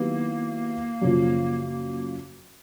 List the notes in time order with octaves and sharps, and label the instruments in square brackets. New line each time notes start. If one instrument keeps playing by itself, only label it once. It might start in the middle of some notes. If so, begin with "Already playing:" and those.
Already playing: [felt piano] D#3 F#3 B3 E4 G4 [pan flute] A#3
[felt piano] F#2 C#3 F3